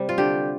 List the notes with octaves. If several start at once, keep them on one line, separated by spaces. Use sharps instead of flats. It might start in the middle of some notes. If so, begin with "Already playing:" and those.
Already playing: C3 G3
F4
D3 G4